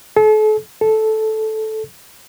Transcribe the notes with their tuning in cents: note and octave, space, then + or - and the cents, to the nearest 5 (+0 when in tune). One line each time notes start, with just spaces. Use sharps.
A4 -40
A4 -10